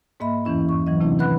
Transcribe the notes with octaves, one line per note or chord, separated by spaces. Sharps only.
G#2 A#3 D#5 E5 B5
E2 G2 E3 C#4 E4
C#6
E3 F#3 D#5
C3 A3 C4 D4 E4
D#3 B4 F#5 B5 F#6